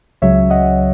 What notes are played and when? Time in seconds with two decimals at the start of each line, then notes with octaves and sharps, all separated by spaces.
0.22 C#2 C#3 F#3 C#5 E5
0.50 D#5 F#5